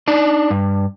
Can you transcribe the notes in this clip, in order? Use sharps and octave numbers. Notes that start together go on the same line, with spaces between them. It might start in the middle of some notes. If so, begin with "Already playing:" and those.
D4 D#4 D5
G2